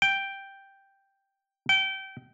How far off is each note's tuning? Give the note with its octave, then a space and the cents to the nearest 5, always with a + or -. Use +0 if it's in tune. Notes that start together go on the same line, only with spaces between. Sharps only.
G5 +0
G5 -25